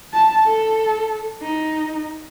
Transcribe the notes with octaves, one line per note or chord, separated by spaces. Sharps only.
A5
A4
D#4